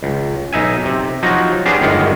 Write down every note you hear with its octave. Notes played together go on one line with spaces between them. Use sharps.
C#2
B1 D#4 E5 G#5
C3
F3 F#3 D#4 F#4
B3 C#4 D4 G4 G#4 C5
G1 F#2 D#3 G#3 A#3 F#5